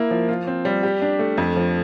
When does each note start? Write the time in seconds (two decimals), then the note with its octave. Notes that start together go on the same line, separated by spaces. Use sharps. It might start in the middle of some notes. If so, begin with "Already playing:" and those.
Already playing: A#3 E4
0.11 F3
0.29 F4
0.47 C4
0.65 G3
0.83 G4
1.02 D4
1.19 A3
1.38 F2
1.56 F3